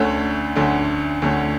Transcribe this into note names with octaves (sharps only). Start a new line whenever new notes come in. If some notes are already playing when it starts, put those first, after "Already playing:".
Already playing: D2 D3 A3 C#4
D2 D3 A3 C#4
D2 D3 A3 C#4